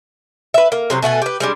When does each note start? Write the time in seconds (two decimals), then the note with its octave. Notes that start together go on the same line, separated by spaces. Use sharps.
0.54 B4 E5
0.72 A#3
0.90 C3 F#3 C5
1.02 B2 A3 F#5 G#5
1.22 G4 B4
1.40 G3 G#3 D4